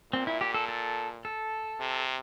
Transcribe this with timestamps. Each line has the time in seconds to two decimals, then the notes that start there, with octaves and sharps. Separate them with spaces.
0.13 A#2 C4
0.27 E4
0.41 G4
0.54 A4
0.69 A4
1.25 A4
1.80 C3